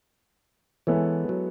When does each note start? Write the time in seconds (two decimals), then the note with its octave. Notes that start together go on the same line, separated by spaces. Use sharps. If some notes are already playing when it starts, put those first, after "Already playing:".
0.87 E3 G#3 B3 E4 A4 C#5
1.29 F#3